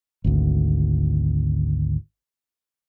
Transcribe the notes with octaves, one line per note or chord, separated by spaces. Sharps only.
G#1 D2